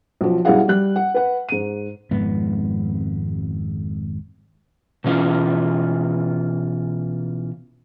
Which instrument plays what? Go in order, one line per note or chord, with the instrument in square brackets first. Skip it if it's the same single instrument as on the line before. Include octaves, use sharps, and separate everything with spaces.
[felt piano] B1 F3
B1 G3 E4 G#4 F5 F#5
G3 F#6
F#5
B4 F#5
G#2 D#7
[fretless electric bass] G#1 F2 G#2 B3
[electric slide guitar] B2 E3 C#4 F4